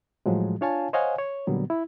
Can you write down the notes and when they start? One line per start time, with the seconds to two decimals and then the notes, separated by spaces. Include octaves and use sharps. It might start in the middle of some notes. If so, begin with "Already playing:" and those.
0.26 A2 F3 F#3 G#3
0.61 D4 F4 C#5 F5 G#5 A5
0.93 C5 C#5 D#5 F5 F#5 G#5
1.18 C#5
1.47 A#2 D3 F#3 G3 B3
1.70 E4